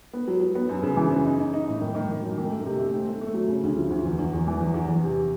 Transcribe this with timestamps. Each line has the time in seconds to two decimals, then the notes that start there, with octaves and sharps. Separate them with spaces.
0.13 B3
0.28 F#3
0.41 F#3
0.55 B3
0.69 F#2
0.83 C#3
0.97 E3
1.11 C#3
1.26 D#4
1.40 D#4
1.54 D#4
1.68 A2
1.81 D#3
1.95 D#3
2.09 D#3
2.22 F#2
2.37 D#3
2.51 A3
2.65 C3
2.79 A3
2.93 C4
3.07 A3
3.21 A3
3.34 F#3
3.48 C#3
3.63 D2
3.77 F3
3.90 D2
4.05 E2
4.18 E2
4.33 E2
4.47 E3
4.61 E2
4.74 E2
4.88 E2
5.03 C3